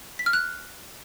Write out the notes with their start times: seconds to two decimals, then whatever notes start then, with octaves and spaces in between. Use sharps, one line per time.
0.19 B6
0.26 F6
0.33 F#6